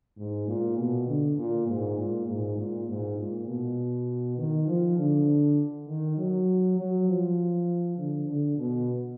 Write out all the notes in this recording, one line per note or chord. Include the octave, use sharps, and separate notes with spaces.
G#2
A#2
B2
D3
A#2
G#2
A#2
G#2
A#2
G#2
A#2
B2
D#3
F3
D3
D#3
F#3
F#3
F3
D3
D3
B2